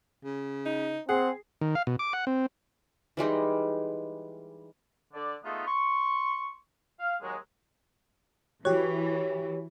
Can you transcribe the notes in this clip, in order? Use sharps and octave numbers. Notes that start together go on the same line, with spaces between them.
C#3
D#4
C4 G#4 F#5
D#3
F5
B2
D6
F#5
C4
E3 G3 G#3 D#4
D3 D5
G#3 A3 B3 D#4 F4
C6 C#6
F5
D#2 F#3 G#3
E3 F#4 G4 C#5